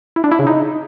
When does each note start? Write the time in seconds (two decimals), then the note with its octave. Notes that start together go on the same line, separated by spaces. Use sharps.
0.16 E4
0.24 D4
0.32 E4
0.39 C#3
0.47 D#4